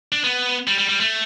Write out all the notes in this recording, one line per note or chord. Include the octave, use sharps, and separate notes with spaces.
D4
B3
G3
G3
G3
A3